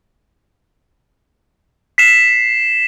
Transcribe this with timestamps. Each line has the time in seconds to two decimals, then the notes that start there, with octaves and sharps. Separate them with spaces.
1.98 B6 C7 E7